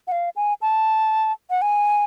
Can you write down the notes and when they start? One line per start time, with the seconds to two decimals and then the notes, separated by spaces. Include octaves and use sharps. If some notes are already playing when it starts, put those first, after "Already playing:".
0.08 F#5
0.12 F5
0.36 G#5
0.62 A5
1.50 F#5
1.62 G#5